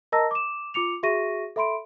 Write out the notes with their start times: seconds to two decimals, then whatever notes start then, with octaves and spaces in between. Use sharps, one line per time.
0.12 A#4 D#5 A5 A#5 E6 A#6
0.31 D6 E7
0.74 F4 D6 C#7 F7
1.03 F#4 G#4 E5 C#6 A#6 D#7
1.56 A4 E5 B5 C6 D7